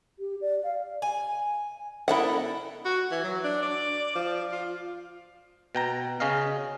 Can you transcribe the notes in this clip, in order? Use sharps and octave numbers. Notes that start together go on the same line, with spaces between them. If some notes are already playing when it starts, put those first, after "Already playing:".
G4
D5
F5
G#5
B3 E4 A4 A#4 F#5
F#4
E3
F#3
D4
D5
F3
F4
B2 G5 A#5
C#3 C#4 D#5 F5